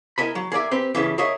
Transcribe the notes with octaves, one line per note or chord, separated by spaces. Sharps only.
E4 A#4 D#5 G#5 B5
F#3
G#4 A#4 D5 E5
C4 G4 B4
G2 A#2 C#3 E3
G#4 A#4 C#5 D#5 E5 G#5